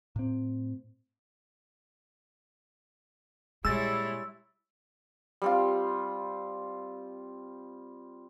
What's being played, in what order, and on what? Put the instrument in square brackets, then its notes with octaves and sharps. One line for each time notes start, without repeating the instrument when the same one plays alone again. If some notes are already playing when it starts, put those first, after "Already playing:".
[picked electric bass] A2 C4
[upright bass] A#2 [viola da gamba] G3 E4 C#5 [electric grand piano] G#3 A6 [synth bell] E6
[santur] G3 C4 F4